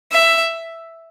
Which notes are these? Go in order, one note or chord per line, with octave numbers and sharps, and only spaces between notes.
E5